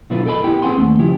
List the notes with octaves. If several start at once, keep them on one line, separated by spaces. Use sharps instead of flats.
B2 D3 F#3 E4 F4 B4
A4 A#4 D#5 G#5 B5
B3 E4 G4 G5
C4 G#4 B4 F#5 G#5 C6
D#2 A3
C#3 F3 E4 G4